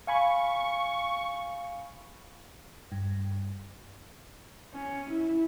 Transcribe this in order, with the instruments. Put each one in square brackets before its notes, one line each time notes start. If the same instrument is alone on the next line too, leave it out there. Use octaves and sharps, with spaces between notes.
[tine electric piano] F5 G#5 B5 [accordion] C#6
[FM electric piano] G2
[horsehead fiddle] C#4
E4